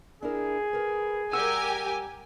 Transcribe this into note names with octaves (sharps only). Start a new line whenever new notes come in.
D4 E4 G#4 A#4
A#4 B4
G3 G4 A#4 F#5 G#5 E6